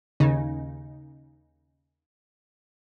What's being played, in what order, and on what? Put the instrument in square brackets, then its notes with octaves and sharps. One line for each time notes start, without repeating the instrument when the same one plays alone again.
[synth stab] D#2 C#3 D#4